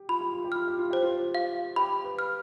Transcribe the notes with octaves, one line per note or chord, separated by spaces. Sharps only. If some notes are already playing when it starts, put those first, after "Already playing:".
Already playing: G4
F4 B5
G4
F4
G4
F4 F6
G4
F4
G4 C5
F4
F5
G4 B5
B4
F6